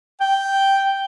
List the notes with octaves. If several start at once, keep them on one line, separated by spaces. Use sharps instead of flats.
G5